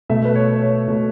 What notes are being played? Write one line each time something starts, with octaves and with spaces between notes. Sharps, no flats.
B2 A3 E5
B4
C#5
C#5
B2 A3